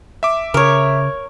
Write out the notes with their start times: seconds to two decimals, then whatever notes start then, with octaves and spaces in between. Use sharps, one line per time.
0.23 E5 D6
0.54 C#3 A#4 C#5